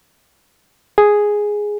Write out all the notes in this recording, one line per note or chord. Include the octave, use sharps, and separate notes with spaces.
G#4